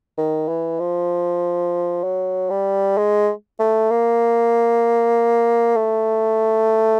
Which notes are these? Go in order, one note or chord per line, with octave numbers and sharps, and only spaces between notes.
D#3
E3
F3
F#3
G3
G#3
A3
A#3
A3